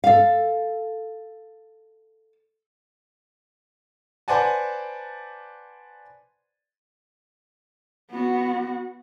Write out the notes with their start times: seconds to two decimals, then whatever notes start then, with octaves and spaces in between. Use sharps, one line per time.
0.04 A4 F5
4.28 B4 C5 D5 F#5 G#5 A5
8.11 B3 F#4